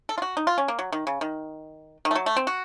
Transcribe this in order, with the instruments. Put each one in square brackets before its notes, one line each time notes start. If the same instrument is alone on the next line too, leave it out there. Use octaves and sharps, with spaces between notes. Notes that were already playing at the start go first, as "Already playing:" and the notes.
[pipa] A4
F4
F#4
D#4
F4
C#4
A#3
F#3
D#3
C#3
D#3
D#3
A3
F#3
A3
C4
F#4